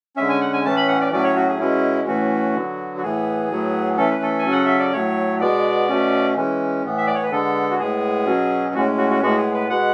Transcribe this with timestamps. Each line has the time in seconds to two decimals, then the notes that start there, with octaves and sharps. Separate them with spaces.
0.16 D3 G#3 C#4 E5
0.29 G#5
0.41 F#5
0.53 G#5
0.64 A2 E3 A3 C#4 A5
0.76 B5
0.88 F#5
1.01 D5
1.12 A2 F#3 A3 C#4 D5
1.24 C#5
1.35 F#4
1.48 G#4
1.59 B2 G#3 C#4 E4
2.07 A2 E3 A3 C#4 F#4
2.54 D3 F#3 B3
2.97 F#4
3.02 A2 E3 B3 G#4
3.50 A2 F#3 B3
3.97 E3 A3 C#4 A4
4.11 B4
4.22 A4
4.39 G#5
4.45 C#3 F#3 C#4
4.51 F#5
4.66 E5
4.79 D5
4.93 A2 F#3 A3 C#5
5.40 B2 G#3 B3 D5
5.89 B2 A3 C#4
6.36 E3 G#3 C#4
6.84 A2 E3 B3
6.98 E5
7.07 D5
7.15 C#5
7.23 B4
7.31 D3 G#3 B3 A4
7.71 F#4
7.79 A2 G#3 B3 G#4
8.26 B2 F#3 C#4
8.74 A2 G#3 C#4 F#4
8.98 F#4
9.10 F#4
9.22 A2 G#3 B3 F#4
9.37 G#4
9.53 B4
9.69 B2 G#3 B3 F#5